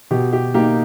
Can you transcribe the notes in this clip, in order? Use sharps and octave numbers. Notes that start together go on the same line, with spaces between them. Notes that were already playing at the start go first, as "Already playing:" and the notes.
B2 G4
G4
A#3 D#4 G4